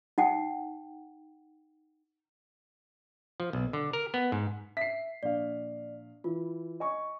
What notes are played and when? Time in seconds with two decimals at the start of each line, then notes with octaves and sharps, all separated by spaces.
0.18 D#4 F#5 G5
3.40 F3
3.53 B1
3.73 D3
3.93 A#4
4.14 B3
4.32 G#2
4.77 E5 B6 C7
5.23 A#1 D5 F5
6.24 E3 F4
6.80 D#5 G#5 C#6